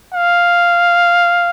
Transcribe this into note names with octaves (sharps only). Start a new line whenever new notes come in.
F5